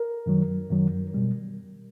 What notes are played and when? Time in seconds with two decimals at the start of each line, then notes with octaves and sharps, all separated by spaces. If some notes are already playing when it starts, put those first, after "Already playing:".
Already playing: A#4
0.26 F#2 D#3 F#3
0.70 F#2 D#3 F#3
1.14 B2 G3